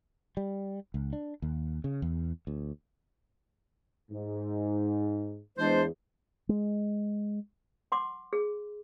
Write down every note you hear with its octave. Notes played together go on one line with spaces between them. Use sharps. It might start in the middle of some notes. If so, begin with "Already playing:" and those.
G3
C#2
D4
D#2
C#3
E2
D2
G#2
E2 G#3 D4 C5
G#3
F#5 C6 D6
G#4